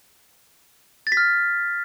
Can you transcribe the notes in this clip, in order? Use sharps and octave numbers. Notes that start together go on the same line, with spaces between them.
A6
B6
F6